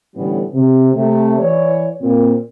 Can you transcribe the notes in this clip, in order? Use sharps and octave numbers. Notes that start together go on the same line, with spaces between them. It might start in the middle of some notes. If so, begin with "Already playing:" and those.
A2 D3 E3 G3 B3 C#4
C3
C3 A3
E3 C#5 D5
A#2 C4